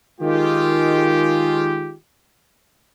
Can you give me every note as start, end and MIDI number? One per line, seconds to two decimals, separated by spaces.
0.21 1.94 51
0.21 1.94 56
0.21 1.94 65
0.21 1.94 67